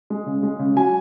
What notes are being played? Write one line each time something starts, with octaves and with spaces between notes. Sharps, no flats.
G#3
C#3
G#3
C#3
F#3 G#5